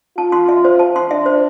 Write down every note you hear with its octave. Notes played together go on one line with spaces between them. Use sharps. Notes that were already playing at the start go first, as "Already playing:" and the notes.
F4 A5
C6
E5
C5
A5
C6
D4 E5
C5